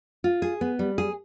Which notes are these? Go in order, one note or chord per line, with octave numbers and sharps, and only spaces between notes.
F4
G#4
B3
G3
G#4